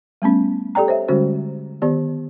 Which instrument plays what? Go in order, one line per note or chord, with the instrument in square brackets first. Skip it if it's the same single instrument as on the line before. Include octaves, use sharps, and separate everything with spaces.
[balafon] G3 A3 B3 C#4
G4 A4 D5 G5 A#5
C5 C#5 D#5 E5
D3 G3 G#3 C#4 F#4 C5
D#3 B3 G4 D5